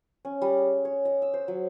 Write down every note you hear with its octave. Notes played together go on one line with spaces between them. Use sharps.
C#4
G3
G#4
C#5
D#5
E6
C5
F#3